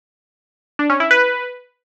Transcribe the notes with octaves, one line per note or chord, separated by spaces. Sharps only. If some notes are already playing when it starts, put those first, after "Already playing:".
D4
C#4
E4
B4